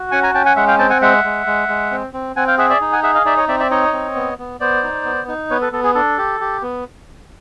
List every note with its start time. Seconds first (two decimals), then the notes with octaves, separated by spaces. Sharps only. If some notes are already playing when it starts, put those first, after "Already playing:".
Already playing: F#4
0.11 C#4 F#5 G#5
0.23 G#5 A#5
0.34 C#4 G5 A5
0.46 F#5 G#5
0.56 G#3 E5 F#5
0.68 F5 G5
0.79 C4 G5 A5
0.90 F#5 G#5
1.01 G#3 E5 F#5
1.24 G#3
1.46 G#3
1.68 G#3
1.91 C4
2.13 C4
2.36 C4 F#5 G#5
2.47 F5 G5
2.58 G#4 E5 F#5
2.70 D5 E5
2.81 D#4
2.92 F#5 G#5
3.03 G#4 E5 F#5
3.14 D#5 F5
3.25 D#4 D5 E5
3.37 C#5 D#5
3.48 C4 D5 E5
3.60 D5 E5
3.71 D#4 C#5 D#5
3.93 C4
4.15 B3
4.39 B3
4.60 B3 C5 D5
4.83 D#4
5.05 B3
5.28 D#4
5.50 B3 B4 C#5
5.61 A4 B4
5.72 B3 A4
5.83 G#4
5.95 D4 A4
6.18 G4
6.40 G4
6.62 B3